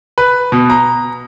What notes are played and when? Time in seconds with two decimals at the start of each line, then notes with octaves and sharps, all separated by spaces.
0.18 B4
0.52 B2
0.70 A#5